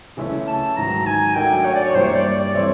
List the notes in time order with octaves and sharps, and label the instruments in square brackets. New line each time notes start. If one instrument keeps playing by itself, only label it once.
[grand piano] C#3 E3 A3 C#4 E4
[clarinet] A5
[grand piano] G#2 D#3 F#3 [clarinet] A#5
[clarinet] G#5
[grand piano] F#3 A3 D4 F#4 A#4 [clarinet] G5
[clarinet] C#5
D5
C#5
[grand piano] G2 E3 G3 A#3 [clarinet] C5
[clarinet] C#5
D5
D5
[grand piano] E3 A3 C4 E4 [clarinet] C#5